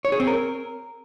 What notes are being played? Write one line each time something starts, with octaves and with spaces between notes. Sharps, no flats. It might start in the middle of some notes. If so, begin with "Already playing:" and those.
C#5
G#4
C4
A#4